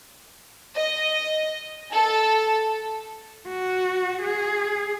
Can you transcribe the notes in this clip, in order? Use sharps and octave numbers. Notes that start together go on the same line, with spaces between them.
D#5
A4
F#4
G#4